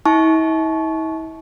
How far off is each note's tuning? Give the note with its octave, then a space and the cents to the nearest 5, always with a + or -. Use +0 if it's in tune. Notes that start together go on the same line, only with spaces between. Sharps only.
E4 -45 A5 -30 C#6 +0